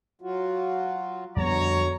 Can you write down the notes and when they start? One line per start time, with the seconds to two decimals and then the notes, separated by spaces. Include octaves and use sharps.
0.22 F#3 F4 F#4
1.36 F2 B2 D3 G3 B3 C#5 A#5